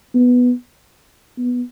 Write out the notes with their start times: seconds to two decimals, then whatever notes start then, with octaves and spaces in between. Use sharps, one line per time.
0.15 B3
1.38 B3